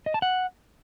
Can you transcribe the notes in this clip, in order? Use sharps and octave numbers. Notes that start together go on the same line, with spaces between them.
D#5
A5
F#5